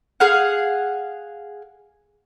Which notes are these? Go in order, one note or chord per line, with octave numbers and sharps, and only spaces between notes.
G#4 F5 F#5